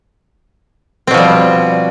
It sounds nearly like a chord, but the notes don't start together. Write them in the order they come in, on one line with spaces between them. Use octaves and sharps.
C4 B2 F3 G3